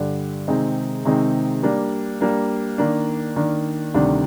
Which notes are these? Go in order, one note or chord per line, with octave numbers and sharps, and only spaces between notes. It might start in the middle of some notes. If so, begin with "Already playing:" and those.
Already playing: G2 D3 G3
C3 D#3 G#3 C4 D#4
C3 D#3 G#3 C4 D#4
G3 A#3 D4
G3 A#3 D4
D#3 A#3 D4
D#3 A#3 D4
D2 C3 D#3 G3 D4